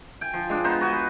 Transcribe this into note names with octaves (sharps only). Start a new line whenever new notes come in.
G5 G#5
F3
G#3 D4
B3 D#4 C5
F#4 G#5
B4